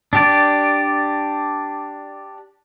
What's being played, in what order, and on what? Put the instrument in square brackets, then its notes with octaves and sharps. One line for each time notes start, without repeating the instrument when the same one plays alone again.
[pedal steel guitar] D4 G4 D5